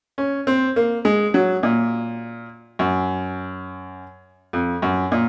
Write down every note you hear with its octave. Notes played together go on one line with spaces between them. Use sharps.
C#4
C4
A#3
G#3
F#3
A#2
F#2
F2
F#2
A#2